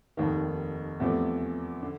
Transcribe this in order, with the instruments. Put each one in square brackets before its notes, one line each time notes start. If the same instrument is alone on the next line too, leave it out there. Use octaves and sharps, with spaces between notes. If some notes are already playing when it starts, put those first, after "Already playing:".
[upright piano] F1 D#2 D#3
E2 C3 F3 A3
D3